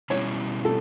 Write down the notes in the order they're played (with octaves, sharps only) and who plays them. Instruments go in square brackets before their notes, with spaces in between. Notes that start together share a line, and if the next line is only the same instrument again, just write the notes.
[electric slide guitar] B2 G3 C#4 E4 [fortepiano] C#5
[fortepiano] A4